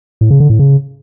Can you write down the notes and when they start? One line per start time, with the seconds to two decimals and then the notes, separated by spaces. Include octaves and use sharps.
0.21 A2
0.31 C#3
0.40 D3
0.50 A2
0.59 C#3